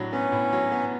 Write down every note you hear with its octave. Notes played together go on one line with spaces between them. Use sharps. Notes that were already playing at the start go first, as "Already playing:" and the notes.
Already playing: A2 F#3 D4
B3 C#4
A2
F#3
B3